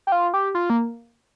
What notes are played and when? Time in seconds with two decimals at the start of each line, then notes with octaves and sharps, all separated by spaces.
0.07 G4
0.12 F4
0.34 G4
0.55 F4
0.70 A#3